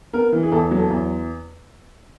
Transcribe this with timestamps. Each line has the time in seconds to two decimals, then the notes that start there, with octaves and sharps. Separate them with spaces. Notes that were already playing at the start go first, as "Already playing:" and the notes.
0.13 B3 A#4
0.33 E3
0.43 G#4
0.52 E2 A4
0.71 F#3
0.78 A4
0.90 E2